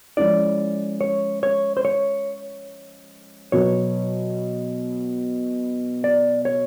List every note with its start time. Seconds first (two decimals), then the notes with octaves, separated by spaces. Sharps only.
0.17 F3 G#3 C#4 E4 D5
1.01 C#5
1.43 C#5
1.77 C5
1.85 C#5
3.52 B2 F#3 B3 C#5
6.04 D5
6.45 C#5